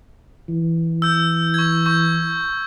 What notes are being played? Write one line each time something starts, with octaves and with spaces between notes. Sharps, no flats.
E3
E6 G6
C#6 G#6
C#6 G6